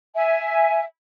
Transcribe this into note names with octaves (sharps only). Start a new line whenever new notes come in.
E5 G#5